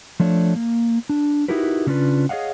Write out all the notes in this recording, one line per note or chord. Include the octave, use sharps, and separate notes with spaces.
F3 A3 D4 C#5
A#3
D4
D#4 E4 F#4 G4 A#4 B4
C#3 C#4 D4 F4 B4
G#4 C#5 D#5 F5 F#5